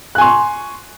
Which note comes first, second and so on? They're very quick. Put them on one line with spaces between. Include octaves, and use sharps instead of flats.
F#6 G#5 C6 C#6